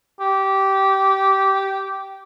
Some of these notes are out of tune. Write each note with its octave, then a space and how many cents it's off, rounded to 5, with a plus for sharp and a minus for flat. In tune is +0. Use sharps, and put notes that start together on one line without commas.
G4 -15